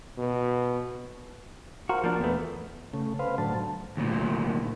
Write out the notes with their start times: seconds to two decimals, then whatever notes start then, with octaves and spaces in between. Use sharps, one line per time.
0.18 B2
1.89 F#4 A#4 C5 F5
2.04 F3 A#3 D4
2.21 E2 B2 A3 B3
2.94 C#3 A3
3.19 B4 C5 F5
3.38 A2 D3 F#3 A5
3.97 D2 A#2